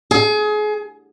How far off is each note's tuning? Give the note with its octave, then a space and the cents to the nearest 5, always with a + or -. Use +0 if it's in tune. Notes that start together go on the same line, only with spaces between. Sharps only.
G#4 +30